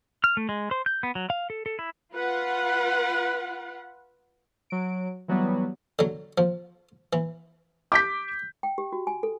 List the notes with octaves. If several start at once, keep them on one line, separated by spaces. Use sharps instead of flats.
F6
A3
G#3
C5
G6
B3
F#3
F5
A4
A4
E4
F4 B4 F#5
F#3 D7
E3 F#3 G3 B3
D3 F#3
F3
E3
D6 G6 B6
G5
G4
F#4
G#5
A4